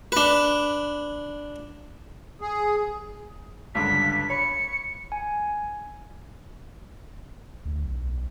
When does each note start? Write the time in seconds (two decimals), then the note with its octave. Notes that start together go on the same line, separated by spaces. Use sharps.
0.12 D4 B4
2.41 G#4
3.75 C#2 G2 D3 B6
4.30 C#5 B5 C#7
5.12 G#5
7.65 D2
7.84 B1